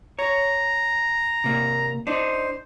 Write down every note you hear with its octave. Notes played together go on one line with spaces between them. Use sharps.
C#5 A#5
C3 A#3
D4 D#4 C5